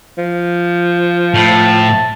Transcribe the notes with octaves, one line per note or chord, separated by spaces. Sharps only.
F3
A2 A5